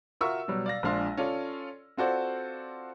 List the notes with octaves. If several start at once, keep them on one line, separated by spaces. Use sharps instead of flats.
F4 F#4 A#4 E5 C#6 E6
B2 F#3 G3
D5 F5 A#6
A#1 A#2 G#3 D4 F5 C6
C#4 F4 A4 D5
C4 F4 F#4 A4 C5 D5